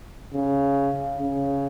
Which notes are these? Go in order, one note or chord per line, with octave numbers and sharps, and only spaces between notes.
C#3
C#3